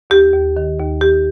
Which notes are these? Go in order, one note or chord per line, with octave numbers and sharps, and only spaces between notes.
D#2 G4
D#2
D#3
D#2
D#2 G4